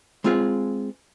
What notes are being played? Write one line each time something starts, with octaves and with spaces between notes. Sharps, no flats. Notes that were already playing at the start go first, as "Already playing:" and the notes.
G#3 C4 F4 G#4 F5